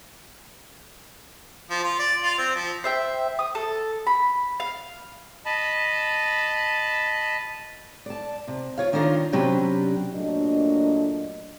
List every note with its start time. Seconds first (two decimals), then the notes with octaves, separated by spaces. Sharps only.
1.70 F3
1.84 F4
1.99 D5
2.22 F4
2.38 C4
2.55 F3
2.84 C5 E5 G5
3.39 D#6
3.55 A4
4.07 B5
4.60 F5
5.46 D#5 A5 B5
8.06 D5 A5
8.48 C3
8.78 F4 C#5 F5
8.93 D#3 D4 E4 F4 A#4 C#5
9.33 C3 F#3 C#4 D4 G4 B4
10.14 A#2 F#3 A3 A#3 D4 D#5